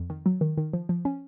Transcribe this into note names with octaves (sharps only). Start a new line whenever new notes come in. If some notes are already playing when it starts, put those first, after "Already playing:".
Already playing: F2
D#3
F#3
D#3
D#3
F3
F3
C#4